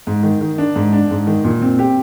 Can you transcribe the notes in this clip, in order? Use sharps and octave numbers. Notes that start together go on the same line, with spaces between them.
G#2
D#3
D#3
D4
G#2
D4
G#2
D#3
A#2
C4
G4